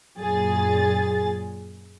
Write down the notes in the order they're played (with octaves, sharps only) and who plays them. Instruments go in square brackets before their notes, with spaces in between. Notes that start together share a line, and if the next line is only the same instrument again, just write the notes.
[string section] F#2 A#2 G#4 A6